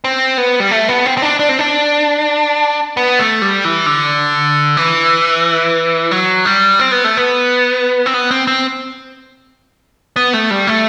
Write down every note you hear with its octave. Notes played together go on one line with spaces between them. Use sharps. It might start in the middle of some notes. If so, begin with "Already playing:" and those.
C4
B3
G3
A3
B3
C4
C4
D4
D4
C4
D4
B3
A3
G3
E3
D3
E3
F#3
G3
C4
B3
A3
B3
C4
B3
C4
C4
B3
A3
G3
A3